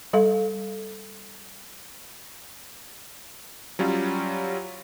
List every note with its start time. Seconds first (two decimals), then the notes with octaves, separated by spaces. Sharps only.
0.13 G3 A4 F5
3.79 F#3 G3 C#4 F4